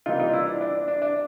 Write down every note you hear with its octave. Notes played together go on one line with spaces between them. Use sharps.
C3 E3 G3 A#3 D#4 F4
D#4 F4
D4 E4
D4
D4
D4
D4
D4